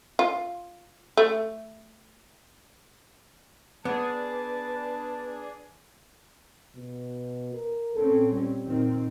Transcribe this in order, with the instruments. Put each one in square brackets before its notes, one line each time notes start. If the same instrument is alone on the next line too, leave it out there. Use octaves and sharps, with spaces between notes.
[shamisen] F4
A3
[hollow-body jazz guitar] B3 [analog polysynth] D4 G#4 [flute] B4 [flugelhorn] A5
[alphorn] B2
A#4
[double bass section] A#2 C4 C#4 [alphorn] A4
[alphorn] G3
[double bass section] A#2 D#3 C4